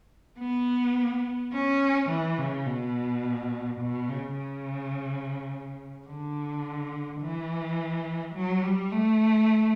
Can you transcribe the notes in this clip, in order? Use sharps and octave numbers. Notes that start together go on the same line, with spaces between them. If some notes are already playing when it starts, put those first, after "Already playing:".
B3
C#4
E3
C#3
B2
B2
C#3
C#3
D3
E3
F#3
G3
A3